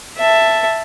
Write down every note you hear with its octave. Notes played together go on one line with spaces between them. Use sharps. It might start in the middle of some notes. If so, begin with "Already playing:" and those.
E5 A5